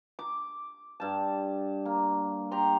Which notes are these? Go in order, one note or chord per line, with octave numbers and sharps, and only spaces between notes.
D6
G2 A5
A#3
G4 A#5 C6